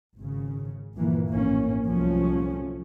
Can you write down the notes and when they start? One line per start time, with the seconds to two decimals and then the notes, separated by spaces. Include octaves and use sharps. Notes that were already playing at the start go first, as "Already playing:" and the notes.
0.17 G#1 C#3
0.95 D2 G2 A#2 E3 F3 A#3
1.29 A#1 A2 A#3 C#4
1.85 C2 F3 F#3 A3 C#4